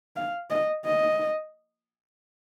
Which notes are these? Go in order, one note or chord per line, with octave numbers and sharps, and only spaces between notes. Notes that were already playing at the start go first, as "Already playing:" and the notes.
F5
D#5
D#5